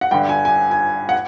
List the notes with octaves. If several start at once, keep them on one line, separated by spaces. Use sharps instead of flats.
F#5
G2 D3 G5
G#5
G#5
G#5
F#5